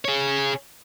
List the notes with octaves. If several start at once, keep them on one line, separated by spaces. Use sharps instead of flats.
G#4 C#5